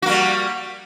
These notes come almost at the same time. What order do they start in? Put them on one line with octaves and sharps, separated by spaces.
F#4 A#3 G3